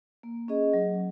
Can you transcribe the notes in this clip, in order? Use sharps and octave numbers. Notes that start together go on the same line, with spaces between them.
A#3
C#4 G#4 D#5
F#3